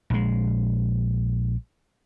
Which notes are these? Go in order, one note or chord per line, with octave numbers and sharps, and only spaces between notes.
A#1 G#3